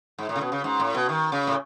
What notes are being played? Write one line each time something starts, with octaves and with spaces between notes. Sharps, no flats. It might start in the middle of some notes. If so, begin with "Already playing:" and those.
G#2
A2
C#3
B2
C#3
G#2
A2
B2
D#3
C#3
A2